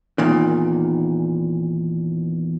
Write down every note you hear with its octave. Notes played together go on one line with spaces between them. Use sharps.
E2 A#2 D#3